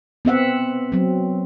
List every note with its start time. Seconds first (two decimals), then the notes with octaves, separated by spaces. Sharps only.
0.25 B3 C4 E5 F#5
0.92 F#3 C4